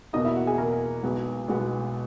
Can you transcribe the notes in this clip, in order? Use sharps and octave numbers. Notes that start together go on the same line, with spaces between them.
E2 B2 A#3 D#4 D#5
E4 E5
F#4 F#5
G#4 G#5
E2 B2 A#3 A#4 A#5
B1 B2 G#3 B3
B1 B2 G#3 B3